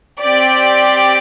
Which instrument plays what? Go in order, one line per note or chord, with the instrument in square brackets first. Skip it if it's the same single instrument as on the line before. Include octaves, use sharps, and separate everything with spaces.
[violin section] C4 G4 D5